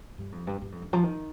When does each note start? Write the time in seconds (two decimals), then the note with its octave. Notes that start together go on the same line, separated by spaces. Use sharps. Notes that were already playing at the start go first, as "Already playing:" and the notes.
0.18 G2
0.32 F2
0.47 G2
0.61 G2
0.72 F2
0.82 G2
0.93 F3
1.04 D#3